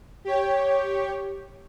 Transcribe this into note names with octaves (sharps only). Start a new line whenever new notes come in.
G4 C#5